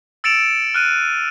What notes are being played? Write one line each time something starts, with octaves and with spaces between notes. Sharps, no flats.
E6 A6 C#7 D7 E7 F7
F6 F#6 D#7